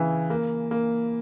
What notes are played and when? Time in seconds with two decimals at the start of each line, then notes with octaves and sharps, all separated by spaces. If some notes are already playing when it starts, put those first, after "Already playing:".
Already playing: C#3 E3
0.30 A#3
0.71 A#3